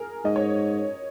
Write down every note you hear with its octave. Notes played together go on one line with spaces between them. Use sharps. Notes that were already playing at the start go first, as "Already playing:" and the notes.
Already playing: G#4 A#4
G#2 D#5
C#5